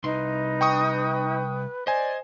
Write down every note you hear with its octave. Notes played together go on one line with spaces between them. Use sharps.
C2 D#4 B4 C6
G5 C#6 D#6
C5 D5 D#5 G#5